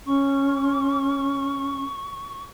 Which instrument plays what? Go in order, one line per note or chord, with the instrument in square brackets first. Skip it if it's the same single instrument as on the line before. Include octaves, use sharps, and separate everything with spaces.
[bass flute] C#4 [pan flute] C#6